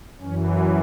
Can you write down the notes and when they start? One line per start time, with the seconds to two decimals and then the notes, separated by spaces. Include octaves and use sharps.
0.21 F#2 E3 C#4